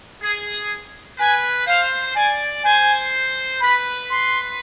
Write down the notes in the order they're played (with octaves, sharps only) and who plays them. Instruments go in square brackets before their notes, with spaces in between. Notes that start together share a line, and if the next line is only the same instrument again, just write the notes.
[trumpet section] G#4
[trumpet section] B4 [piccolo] G#5
[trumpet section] C5 [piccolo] F5
[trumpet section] D5 [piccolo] G#5
[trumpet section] C5 [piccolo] G#5
[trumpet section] B4 [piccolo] B5
[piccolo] C6